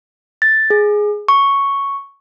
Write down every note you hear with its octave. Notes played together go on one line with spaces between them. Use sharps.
A6
G#4
C#6